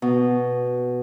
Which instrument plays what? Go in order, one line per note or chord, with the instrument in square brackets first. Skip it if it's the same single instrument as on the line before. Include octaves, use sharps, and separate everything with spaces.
[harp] B2